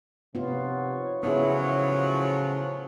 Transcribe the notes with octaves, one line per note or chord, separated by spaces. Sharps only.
F#2 C3 B3 D#4 F4 C#5
A2 C#3 F3 F#3 B3 E4 G#4